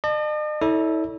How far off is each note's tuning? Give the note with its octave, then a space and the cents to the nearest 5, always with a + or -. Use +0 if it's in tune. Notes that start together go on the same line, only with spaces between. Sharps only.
D#5 -45 A5 +0
E4 -40 A4 +0 C#5 +45